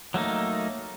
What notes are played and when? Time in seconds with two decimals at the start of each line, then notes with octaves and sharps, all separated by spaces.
0.14 F#3 A3 A#3 D#4